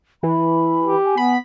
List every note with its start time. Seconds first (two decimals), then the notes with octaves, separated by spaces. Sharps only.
0.23 E3 B5
0.82 G4
1.05 G#5
1.17 B3 B5